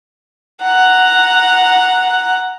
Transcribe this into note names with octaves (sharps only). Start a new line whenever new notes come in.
F#5 A#5